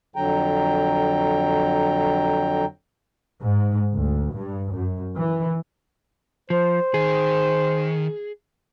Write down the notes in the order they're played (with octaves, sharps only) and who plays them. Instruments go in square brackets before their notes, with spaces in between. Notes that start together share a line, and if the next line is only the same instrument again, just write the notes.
[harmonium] F2 D3 F#3 G5 A#5
[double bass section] G#2
D2
G2
F#2
E3
[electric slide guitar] F3 [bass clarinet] C5
[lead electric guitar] D#3 [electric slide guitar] G#4